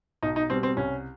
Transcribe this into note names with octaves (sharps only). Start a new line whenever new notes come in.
B1 D#4
D#4
B2 G3 C4
C4
C2 C#4